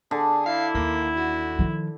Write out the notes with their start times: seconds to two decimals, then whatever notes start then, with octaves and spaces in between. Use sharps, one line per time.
0.11 D3 G#4
0.46 E4 F5
0.75 D#2 A#3
1.16 F#4
1.59 D#3 F3